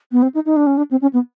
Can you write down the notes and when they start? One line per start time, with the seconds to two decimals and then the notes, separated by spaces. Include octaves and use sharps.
0.12 B3
0.22 C4
0.35 D#4
0.46 D#4
0.56 D4
0.67 C#4
0.77 D4
0.91 C4
1.02 C#4
1.13 B3